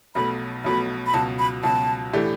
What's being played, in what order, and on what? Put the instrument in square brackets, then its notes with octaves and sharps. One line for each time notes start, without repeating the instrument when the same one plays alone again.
[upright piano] B1 B2 F#3 A3 [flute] B5
[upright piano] B1 B2 F#3 A3 [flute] B5
[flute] B5
[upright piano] C#2 B2 F#3 [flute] A5
[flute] B5
[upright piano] C#2 B2 F#3 [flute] A5
[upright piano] A2 E3 A3 D4 G4